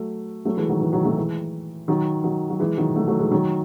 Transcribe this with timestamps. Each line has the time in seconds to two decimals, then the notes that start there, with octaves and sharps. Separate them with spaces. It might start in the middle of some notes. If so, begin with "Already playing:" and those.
Already playing: F#3 A3
0.45 F#3 A3
0.57 E3 G#3
0.69 D#3 F#3
0.81 E3
0.93 D#3 F#3
1.05 F#3 A3
1.16 E3 G#3
1.88 D#3 F#3
2.24 D#3 F#3
2.50 F#3
2.59 E3 G#3
2.78 D#3 F#3
2.95 F#3 A3
3.08 F#3 A3
3.19 E3 G#3
3.31 D#3 F#3